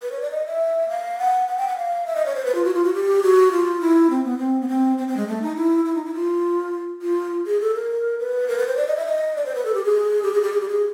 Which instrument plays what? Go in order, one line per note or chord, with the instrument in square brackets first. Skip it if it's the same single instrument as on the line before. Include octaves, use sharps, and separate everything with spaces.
[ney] B4
C#5
D5
D#5
E5
F5
F#5
F#5
G5
F#5
F5
E5
D#5
C#5
C5
B4
F4
F#4
F4
F#4
G4
F#4
F4
E4
C4
B3
C4
B3
C4
C4
C4
G#3
A3
D#4
E4
E4
D#4
E4
F4
F4
G#4
A4
A#4
B4
A#4
B4
C5
D5
D#5
E5
D#5
D5
C5
B4
A4
G4
G#4
G4
G#4
G4
G#4
G4
G#4